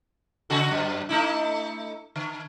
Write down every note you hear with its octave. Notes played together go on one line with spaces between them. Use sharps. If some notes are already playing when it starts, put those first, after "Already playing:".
C#3 F#4 A4
F#2
A3 D#4 E4
D3